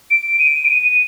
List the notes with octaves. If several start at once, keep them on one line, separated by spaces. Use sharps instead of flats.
D7
D#7
D7
D#7